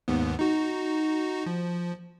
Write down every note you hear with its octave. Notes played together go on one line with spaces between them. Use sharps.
D#2 G#2 B3
D#4 F#4
F3